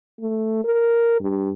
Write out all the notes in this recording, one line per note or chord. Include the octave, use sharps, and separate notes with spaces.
A3
A#4
G2